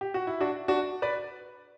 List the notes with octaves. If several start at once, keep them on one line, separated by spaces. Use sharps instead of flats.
G4
F#4
E4
D4 F#4
D4 F#4
B4 D5